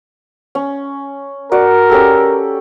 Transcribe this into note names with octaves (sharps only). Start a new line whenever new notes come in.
C#4
F#4 A#4 D5 F#5
C#4 G4 A4